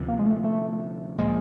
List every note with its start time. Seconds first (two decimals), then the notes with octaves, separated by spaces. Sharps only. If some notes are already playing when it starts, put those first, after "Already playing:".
Already playing: D2 C3 F3
0.08 A#3
0.19 G#3
0.26 A3
0.44 A3
1.18 A#2 F3 G#3 A#3